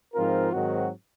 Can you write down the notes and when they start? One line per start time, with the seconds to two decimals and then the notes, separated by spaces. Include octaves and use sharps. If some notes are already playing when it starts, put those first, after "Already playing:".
0.13 G#2 F3 C4 F4 A#4
0.51 G#2 D#3 F#3 C4 F#4